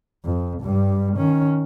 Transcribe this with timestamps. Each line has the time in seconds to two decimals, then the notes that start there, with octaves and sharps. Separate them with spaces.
0.25 F2
0.62 G2 G3
1.17 D#3 C#4